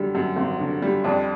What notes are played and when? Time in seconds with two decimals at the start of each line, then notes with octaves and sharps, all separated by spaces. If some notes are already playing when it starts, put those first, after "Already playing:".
Already playing: F#2 D3 G3
0.15 F#2
0.36 G#1
0.60 D3
0.82 G3
1.04 F2 D4